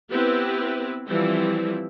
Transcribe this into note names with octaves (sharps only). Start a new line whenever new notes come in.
B3 C4 E4 G4 B4
E3 F3 G3 C4 E4